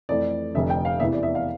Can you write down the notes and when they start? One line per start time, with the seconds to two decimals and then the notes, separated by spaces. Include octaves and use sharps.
0.09 F2 E3 A3 D5
0.54 F1 F2 D3 E5
0.70 G5
0.85 F5
1.00 E2 C3 E3 B3 E5
1.13 D5
1.23 E5
1.35 F5